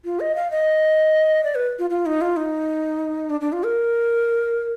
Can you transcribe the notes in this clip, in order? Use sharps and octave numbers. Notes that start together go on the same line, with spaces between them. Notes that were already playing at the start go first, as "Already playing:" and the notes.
F4
D#5
F5
D#5
D5
B4
F4
F4
D#4
F4
D#4
D4
D4
F4
A#4